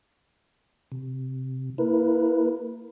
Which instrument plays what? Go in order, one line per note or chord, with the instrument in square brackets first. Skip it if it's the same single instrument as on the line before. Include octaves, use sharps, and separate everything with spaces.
[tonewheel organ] C3
[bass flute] A#3 [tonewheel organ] E4 A#4 B4